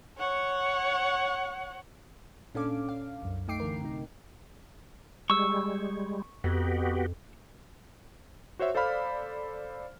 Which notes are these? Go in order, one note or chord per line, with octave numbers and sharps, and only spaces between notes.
C#5 F#5
A#2 C#4 D4 A4 F5 D6
F5
C2 F#2
A3 D#4 G5 D6 C7 D7
D3 E3 A#4
C3 D#4
G3 G#3 C#6 E6
F2 B3 F#4 G4
F#4 C5 C#5 E5
A4 C5 D5 F5 B5 F6